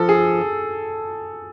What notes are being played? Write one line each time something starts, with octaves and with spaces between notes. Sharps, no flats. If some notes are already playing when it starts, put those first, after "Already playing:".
Already playing: F3 A4
G#4